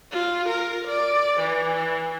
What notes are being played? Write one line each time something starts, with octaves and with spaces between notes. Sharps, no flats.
F4
A#4
D5
E3